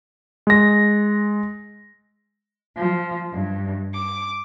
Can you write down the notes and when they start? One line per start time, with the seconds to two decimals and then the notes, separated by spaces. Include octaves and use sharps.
0.47 G#3 A#6
2.76 F3
3.33 G2
3.93 D6